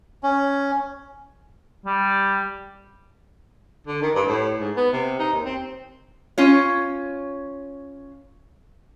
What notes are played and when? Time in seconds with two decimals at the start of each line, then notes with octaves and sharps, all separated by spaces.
0.23 C#4
1.86 G3
3.87 D3
4.02 D#3
4.15 G2
4.27 A2
4.60 G#2
4.77 B3
4.93 C3
5.19 D#4
5.33 D#2
5.45 C4
6.38 C#4 F4 C#5